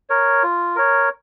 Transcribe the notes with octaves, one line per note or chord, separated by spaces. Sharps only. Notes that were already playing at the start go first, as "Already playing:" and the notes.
A#4 C#5
F4
A#4 C#5